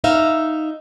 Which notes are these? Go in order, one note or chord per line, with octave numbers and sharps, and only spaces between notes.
D#4 E5 F5